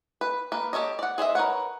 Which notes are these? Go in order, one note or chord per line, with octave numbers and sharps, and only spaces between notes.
B4
A#3 B4
G4 A4 C#5 D#5
D5 F#5
G#4 C5 D#5 E5
A#4 B4 C#5 F#5